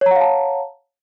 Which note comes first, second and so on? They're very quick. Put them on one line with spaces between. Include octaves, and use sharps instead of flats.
C#5 A#5 F#5 F5 A5